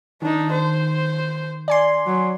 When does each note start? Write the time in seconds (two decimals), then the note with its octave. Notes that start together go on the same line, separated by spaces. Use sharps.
0.22 D#3 D4 D#4
0.52 C5
1.68 D5 G#5 C6
2.06 F#3